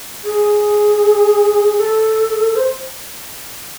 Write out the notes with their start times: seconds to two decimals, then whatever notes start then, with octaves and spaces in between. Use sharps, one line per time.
0.24 G#4
1.77 A4
2.55 C5